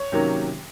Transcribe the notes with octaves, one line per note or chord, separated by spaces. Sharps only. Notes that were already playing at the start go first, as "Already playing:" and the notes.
Already playing: C#5
C3 D#3 F#3 A#3 C#4